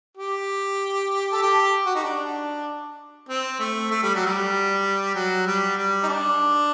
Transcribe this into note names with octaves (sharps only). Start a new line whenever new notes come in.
G4
A4
G4
F#4
D#4
D4
C4
A3
A3
G3
F#3
G3
F#3
G3
G3
D#4
D4